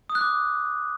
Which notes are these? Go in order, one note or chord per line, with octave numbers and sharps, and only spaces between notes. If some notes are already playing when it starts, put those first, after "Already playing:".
D#6
F#6
D6